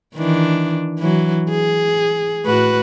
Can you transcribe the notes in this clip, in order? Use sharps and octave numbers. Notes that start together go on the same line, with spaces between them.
D#3 E3 D4
E3 F#3
G#4
A2 F#4 B4